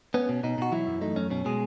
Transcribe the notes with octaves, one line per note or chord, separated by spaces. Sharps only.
B3 C#4
B2
B2 D#4
B2 F#4
E3 F#3 E4
F#2
A3 D#4
F#2 C#4
B2 C#4
B2 G#3 G#4